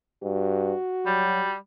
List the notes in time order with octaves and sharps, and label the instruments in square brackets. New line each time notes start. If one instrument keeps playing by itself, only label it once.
[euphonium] G2 [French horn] F#4
[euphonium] F#3 [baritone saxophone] G3